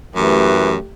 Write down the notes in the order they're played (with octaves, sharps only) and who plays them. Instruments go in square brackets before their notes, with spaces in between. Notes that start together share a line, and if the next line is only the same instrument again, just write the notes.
[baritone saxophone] F#2 [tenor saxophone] E3 [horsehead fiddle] A3 G4